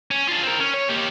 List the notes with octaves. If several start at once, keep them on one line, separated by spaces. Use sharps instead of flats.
C#4
D4 F4
C4 A#4
C#4
C#5
A#3 G4